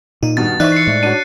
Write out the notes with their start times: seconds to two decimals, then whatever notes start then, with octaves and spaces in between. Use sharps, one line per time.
0.23 A#2 D#4
0.37 G2 B2 D#3 A6
0.60 E3 D#4 C5 D5 E5 C#6 F#6
0.72 C7 C#7
0.87 A2 G#3
1.03 D4 F#4 C#5 D#7